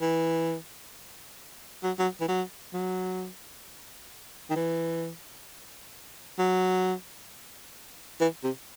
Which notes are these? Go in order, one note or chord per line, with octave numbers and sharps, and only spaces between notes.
E3
F#3
F#3
E3
F#3
F#3
D#3
E3
F#3
E3
C3